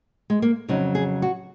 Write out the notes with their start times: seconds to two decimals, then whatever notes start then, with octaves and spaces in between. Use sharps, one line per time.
0.30 G#3
0.42 A#3
0.68 F2 C#3 F#3 D#4
0.95 G#4
1.22 F#4